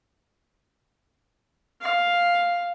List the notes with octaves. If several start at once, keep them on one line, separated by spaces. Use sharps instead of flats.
F5